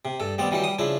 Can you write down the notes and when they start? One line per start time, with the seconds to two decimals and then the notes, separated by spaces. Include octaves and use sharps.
0.05 C3
0.20 G2 A4
0.38 D#2 G3 B3 C4 D5
0.51 D#3 E3 F#3 G3 G4
0.64 G3 D#6
0.79 C#3 F3 D4 E4